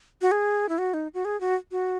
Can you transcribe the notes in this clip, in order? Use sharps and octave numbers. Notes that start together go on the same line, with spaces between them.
F#4
G#4
E4
F#4
D#4
F#4
G#4
F#4
F#4